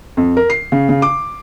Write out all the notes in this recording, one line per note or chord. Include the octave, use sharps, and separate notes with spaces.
F2
A#4
C7
C#3
C#3
D6